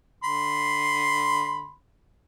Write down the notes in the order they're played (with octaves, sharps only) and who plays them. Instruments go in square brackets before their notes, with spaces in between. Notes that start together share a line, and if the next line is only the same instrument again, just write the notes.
[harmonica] D3 B5 C6